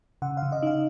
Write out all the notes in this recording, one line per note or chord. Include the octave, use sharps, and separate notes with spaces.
C#3 F#5
F5
C#3
D#5
D#4 F5